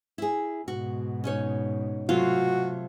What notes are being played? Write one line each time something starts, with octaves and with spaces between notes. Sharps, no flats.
E4 G#4
G#2 B2 F#4
C#4 D#4 C#5
C3 F#3 A3 F4 F#4